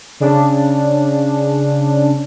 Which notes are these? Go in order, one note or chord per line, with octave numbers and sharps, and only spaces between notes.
C#3 D4